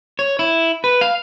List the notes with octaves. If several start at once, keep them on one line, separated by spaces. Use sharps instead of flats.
C#5
E4
B4
F5